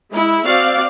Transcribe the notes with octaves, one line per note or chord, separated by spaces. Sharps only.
G#3 E4
C4 F#4 D5 F5